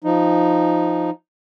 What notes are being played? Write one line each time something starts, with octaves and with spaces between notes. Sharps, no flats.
F3 D#4